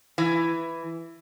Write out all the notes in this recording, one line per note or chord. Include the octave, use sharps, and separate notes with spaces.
E3